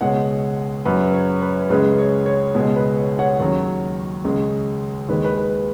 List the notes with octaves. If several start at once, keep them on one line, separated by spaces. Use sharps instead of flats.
C#2 B2 G#3 C#5 F#5
F#2 C#3 F#3 B4
C#5
B4
C#2 C#3 G#3 B4
C#5
C#5
C#2 B2 G#3
B4
C#5
C#5 F#5
D#2 C#3 F#3 C#5
C#2 C#3 G#3
D#2 D#3 G#3 B4
B4
B4